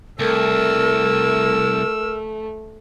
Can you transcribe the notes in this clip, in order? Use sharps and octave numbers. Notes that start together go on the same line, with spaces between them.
C2 A3 A#4 E6